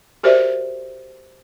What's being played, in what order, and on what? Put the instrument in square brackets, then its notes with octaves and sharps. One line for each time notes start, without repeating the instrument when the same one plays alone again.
[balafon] F#4 G4 A#4 C5 D5 E5